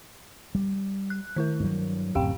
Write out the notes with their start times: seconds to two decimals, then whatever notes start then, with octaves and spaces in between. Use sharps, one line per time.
0.55 G3
1.10 F#6
1.36 D#3 E4 A#4
1.60 G2 F#3
2.15 D1 F#2 C4 G4 F5 G5